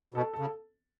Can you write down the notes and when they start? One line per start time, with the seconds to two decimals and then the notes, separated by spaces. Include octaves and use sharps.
0.14 B2 A4
0.34 C#3 A4